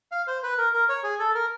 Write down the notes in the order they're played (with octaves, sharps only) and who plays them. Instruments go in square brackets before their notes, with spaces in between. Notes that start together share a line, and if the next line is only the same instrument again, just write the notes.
[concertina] F5
C5
B4
A#4
A#4
C#5
G#4
A4
A#4